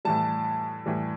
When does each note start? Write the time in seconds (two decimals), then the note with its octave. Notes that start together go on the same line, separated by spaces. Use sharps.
0.05 A2 E3 G3 A5
0.86 A2 E3 G3